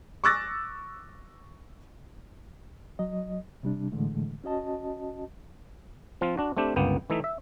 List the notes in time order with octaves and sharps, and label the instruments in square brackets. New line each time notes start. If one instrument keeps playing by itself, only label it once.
[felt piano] C#6 D6 E6 F#6 A6 A#6
[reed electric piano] F#3 D#5
C3 G3 D4
A2 D3 E3 G#3 A3
C#4 F#4 D#5 A5
[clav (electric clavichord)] F3 C4 F4
D4 F#4
A3 C4 D4 G4
G1 C#2 A#3 B3 G5
E3 A3 D#4 E5
E5